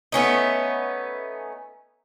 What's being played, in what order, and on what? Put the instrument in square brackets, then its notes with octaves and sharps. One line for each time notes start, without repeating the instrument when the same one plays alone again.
[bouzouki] A3 B3 C#4 D#4